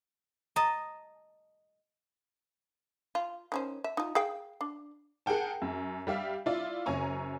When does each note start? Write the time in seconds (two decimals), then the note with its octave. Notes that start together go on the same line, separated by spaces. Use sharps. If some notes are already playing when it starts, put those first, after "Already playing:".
0.56 D#5 A5 A#5
3.15 F4
3.52 D#3 C#4 C5
3.84 E5
3.97 D#4 F4
4.15 G#4 F5 G5
4.61 D4
5.26 G#4 A#4 F#5 G5 A5
5.62 F#2
6.07 G3 G4 E5 F5
6.46 E4 F4 D5
6.86 F#1 F#2 C#5 G#5 A#5 C#6